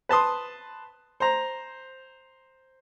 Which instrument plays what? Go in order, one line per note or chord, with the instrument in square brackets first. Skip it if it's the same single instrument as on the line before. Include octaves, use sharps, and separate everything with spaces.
[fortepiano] B4 A5 C6 D#6
C5 A#5